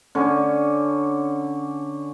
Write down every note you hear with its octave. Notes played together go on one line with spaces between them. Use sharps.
D3 C#4